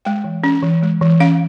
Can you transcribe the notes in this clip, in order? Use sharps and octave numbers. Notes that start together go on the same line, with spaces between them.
G#3 G5
E3
C#4
E3
G#3
E3
C#4 F5